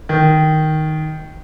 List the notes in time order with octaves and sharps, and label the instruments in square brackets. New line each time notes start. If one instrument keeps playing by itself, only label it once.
[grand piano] D#3